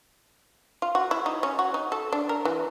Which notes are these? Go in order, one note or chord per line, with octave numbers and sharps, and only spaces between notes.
F4
F#4
E4
D#4
C#4
F#4
D#4
A4
D4
A#4
E3